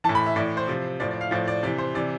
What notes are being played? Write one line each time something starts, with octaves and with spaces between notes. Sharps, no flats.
A2 E3 A5
B5
E5
A2 E3 D5
C5
C3 F3
A2 F3 D5
D5
F5
A2 F3 D5
D5
C3 E3 D5
C5
C3 E3 D5